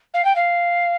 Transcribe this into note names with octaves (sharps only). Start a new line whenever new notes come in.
F5
G5
F5